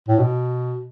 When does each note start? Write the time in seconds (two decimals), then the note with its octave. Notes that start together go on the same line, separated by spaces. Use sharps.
0.08 A2
0.19 B2